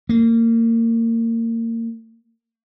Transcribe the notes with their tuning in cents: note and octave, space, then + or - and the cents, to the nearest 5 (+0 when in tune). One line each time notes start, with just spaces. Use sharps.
A#3 -30